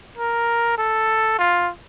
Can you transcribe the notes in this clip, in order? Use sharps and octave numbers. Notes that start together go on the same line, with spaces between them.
A#4
A4
F4